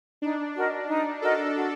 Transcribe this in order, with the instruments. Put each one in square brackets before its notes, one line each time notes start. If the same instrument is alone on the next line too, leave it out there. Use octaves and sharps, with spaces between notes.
[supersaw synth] D4 [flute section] D#4
[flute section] F#4 A#4 D#5
D#4
[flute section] F#4 A#4 D#5 [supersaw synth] A4
[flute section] F#4